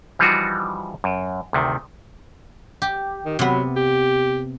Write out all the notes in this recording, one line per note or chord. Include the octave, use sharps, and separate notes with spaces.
E3 F3 G3 D#4 F4 F#4
F#2
D2 C3 D#3
G4
D#3
C3 F#3 B3
G4